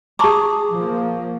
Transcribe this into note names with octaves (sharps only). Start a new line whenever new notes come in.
G#4 A5 A#5 C#6 D6
F3 A#3